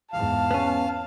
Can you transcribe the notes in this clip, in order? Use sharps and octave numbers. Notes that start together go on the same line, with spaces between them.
E2 G#2 F5 A5
B3 C#4